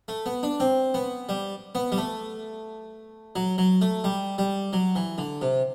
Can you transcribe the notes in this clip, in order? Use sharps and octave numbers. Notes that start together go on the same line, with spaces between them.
A3
B3
D4
C4
B3
G3
B3
G3
A3
F#3
F#3
A3
G3
G3
F#3
E3
D3
C3